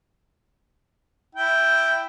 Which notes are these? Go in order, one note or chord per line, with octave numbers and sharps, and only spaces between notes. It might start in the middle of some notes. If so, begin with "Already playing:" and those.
E4 G5